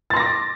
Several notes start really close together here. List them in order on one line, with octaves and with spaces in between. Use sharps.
A6 C6 A#6 D6